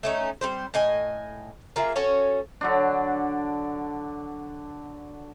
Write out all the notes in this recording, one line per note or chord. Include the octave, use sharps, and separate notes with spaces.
A3 C#4 D#4
G3 C4 C5
A2 D#5 G#5
A#3 F4 G#4 E5
C#4 F#4 A4 C#5
D3 F#3 D4